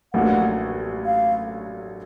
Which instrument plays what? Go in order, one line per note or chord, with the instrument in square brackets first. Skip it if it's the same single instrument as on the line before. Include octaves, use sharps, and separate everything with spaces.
[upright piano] A1 A2 F#3 A#3 D4 [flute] F#5
[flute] F5